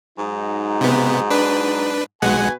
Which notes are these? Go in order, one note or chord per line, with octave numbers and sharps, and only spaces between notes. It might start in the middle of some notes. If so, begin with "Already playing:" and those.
G#2 F#3 D#4
C3 B3
D4 B4
B1 B2 G#3 B4 F#5 G#5